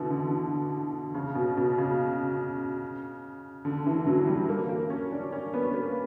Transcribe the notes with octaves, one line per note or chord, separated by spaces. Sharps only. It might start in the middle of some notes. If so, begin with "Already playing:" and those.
Already playing: B2 D3 E3
D3
C#3
B2
B2
C#3
D3
E3
F#3
G3
A#3
A#3
C#4
D4
C#4
B3
A#3